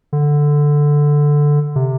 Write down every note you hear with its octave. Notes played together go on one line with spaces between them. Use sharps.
D3
C3